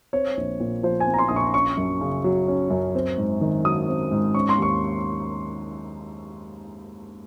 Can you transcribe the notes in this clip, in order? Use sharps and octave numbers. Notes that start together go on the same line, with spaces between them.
C4 C#5
A#1
A#2
F3 C5
G#5
C4
A#5
C6
A#1 D#6
C#6
C#4 C#6
F#2
C#3
F#3
C#4
F#2
C4
G#2
D#3
F#3 D#6
C4
G#2
C#4 C#6
C6
D#2 C#6